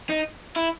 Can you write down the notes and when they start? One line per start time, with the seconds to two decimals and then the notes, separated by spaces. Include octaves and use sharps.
0.09 D#4
0.56 E4